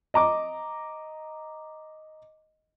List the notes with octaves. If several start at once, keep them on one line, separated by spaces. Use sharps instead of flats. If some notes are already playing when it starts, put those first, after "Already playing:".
D#5 A#5 D6